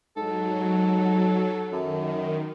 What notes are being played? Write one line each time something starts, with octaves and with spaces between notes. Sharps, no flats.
G#2 F#3 A4
F#2 D#3